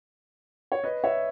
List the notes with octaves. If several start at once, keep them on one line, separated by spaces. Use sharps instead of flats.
C#5
B4 D#5
C#5 E5